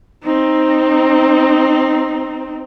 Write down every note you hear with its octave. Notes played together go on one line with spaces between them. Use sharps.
C4 D#4